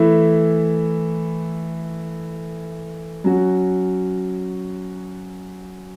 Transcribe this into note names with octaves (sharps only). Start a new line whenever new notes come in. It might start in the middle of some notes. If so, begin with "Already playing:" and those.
Already playing: E3 A3 E4
F#3 C#4 F#4